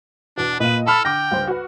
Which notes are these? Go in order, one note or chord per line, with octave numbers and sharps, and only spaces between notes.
E2 B2 D4
A#2 B4 D#5 F5 D#7
A4 A5 B5 F6
D3 G5 D6 A#6
C#2 G2 C5
F#4 B4